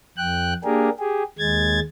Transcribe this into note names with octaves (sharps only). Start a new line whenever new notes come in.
F2 G5 F#6
A#3 D4 G4 G#4 A#4
G4 G#4
D#2 G#3 G#6 A6